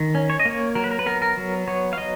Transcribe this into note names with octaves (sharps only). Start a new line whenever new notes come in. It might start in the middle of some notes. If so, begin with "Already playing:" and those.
Already playing: D#3
C#4
C#5
D#5
A#3 C#5
F#3 A#4
B4
A#4
B4
B3 A#4
A#4
F#3
B3 C#5
F5
F#3 D#5